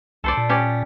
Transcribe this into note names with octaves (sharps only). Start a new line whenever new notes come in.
C2 A4 C5 D5
A#2
C#4 G4 D5